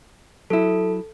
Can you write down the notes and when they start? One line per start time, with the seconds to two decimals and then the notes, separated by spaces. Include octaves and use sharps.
0.50 F#3 E4 A4